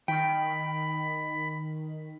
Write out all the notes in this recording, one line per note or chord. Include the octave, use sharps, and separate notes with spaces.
D#3 G5 B5